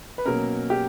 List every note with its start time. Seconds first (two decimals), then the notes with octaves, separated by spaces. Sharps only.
0.18 B4
0.25 B2 F#3 A#3 C#4 A#4
0.70 G4